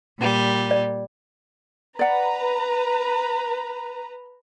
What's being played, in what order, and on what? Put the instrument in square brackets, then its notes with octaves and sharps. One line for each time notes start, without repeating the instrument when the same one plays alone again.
[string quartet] A#2 G3
[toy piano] D5
[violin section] B4 A#5 [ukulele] D5 F#5